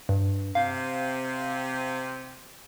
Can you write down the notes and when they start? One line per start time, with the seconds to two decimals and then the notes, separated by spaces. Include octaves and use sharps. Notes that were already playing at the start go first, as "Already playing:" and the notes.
0.09 G2
0.55 C3 F5